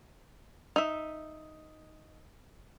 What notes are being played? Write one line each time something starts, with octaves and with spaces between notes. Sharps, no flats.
D#4 E5